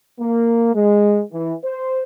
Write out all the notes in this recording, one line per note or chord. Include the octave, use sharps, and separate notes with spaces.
A#3
G#3
E3
C5